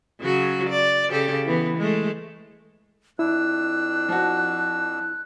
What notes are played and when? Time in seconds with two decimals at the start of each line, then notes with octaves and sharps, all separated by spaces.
0.20 C#3 F#3 F#4
0.70 D5
1.10 C#3 G4 A4
1.45 E3 B3
1.78 G#3 A3
3.19 F2 D4 E4 E6 F#6
4.09 F3 F#4